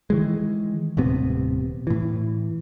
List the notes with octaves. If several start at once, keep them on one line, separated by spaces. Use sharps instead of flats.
D#3 E3 G#3
D#1 A2 C3 B3
A2 E3